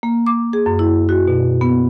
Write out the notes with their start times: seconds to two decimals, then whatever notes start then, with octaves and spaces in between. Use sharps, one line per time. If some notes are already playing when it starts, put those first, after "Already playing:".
0.03 A#3
0.27 D6
0.53 G#4
0.66 F#2
0.79 E4
1.09 F#4
1.27 B2
1.61 B3